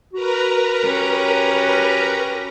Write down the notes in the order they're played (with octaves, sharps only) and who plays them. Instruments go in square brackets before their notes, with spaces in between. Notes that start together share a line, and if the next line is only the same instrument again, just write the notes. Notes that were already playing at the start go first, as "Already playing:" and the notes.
[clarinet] F#4 [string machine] A#4 B4 A#5
[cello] C#4 G4